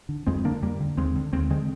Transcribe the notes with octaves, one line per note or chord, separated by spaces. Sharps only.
D3
F2 G#3 C4
D3 A#3 D4
F2 G3 A#3
D3
D#2 G#3 C4
D3
D#2 G#3 C4
D3 G#3 C4